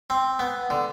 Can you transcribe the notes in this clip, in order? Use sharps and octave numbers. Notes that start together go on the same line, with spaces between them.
C4
B3
D3